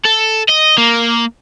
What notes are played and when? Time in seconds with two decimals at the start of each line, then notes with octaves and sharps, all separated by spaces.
0.05 A4
0.49 D#5
0.78 A#3